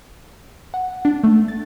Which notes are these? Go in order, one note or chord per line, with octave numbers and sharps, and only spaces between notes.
F#5
D4
A3
A6